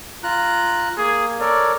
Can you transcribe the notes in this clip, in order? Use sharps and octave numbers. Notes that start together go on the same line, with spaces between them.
F4 A#5 F#6
A#3 G#4
A4 A#4 C#5 D5